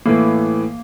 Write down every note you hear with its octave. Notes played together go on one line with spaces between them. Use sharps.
A2 E3 A3 A#3